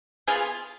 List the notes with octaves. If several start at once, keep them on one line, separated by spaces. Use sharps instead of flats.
B3 F4 G#4 G#5